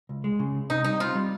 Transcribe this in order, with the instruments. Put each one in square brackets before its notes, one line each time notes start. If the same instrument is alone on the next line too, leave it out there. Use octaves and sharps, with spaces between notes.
[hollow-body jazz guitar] C#2
G#3
C#3
C#2
[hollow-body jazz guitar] C3 [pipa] D#4
[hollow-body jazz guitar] G3 [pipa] D#4
[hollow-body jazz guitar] C4 [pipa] F4
[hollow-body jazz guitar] G3